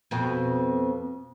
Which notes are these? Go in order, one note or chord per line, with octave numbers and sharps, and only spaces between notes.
F2 B2